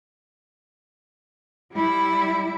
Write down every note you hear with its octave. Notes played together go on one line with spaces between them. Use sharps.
G3 E4